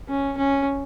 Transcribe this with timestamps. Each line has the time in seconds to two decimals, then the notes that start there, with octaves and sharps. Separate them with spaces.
0.08 C#4
0.38 C#4